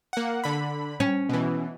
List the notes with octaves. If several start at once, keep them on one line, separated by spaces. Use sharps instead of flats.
A#3 F#5
D3 B5
C#4
B2 E3